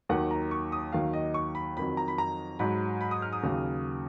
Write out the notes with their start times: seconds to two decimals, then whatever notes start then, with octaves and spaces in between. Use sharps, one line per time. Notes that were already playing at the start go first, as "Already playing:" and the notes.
0.09 D#2 D#3 F#3 F#5
0.31 A#5
0.51 C#6
0.72 D#6
0.92 D#2 D#3 F#3 F5
1.13 D#5
1.34 C#6
1.55 B5
1.77 F2 D#3 F#3 B5
1.97 A#5
2.08 B5
2.18 A#5
2.59 G#2 F#3 B5
3.01 B5
3.11 D#6
3.22 F6
3.33 D#6
3.43 D#2 C#3 F#3